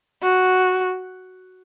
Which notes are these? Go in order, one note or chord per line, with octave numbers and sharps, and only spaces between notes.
F#4